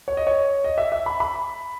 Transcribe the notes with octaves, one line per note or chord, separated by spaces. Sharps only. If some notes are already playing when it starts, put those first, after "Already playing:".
C#5
D#5
C#5
D#5
E5
E5
B5
B5